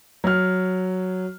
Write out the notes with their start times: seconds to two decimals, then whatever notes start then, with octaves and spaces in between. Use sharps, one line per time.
0.24 F#3 F6